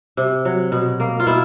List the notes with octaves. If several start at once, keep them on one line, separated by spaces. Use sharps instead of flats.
C3
F#3
B2
A#3
F4
B2 E4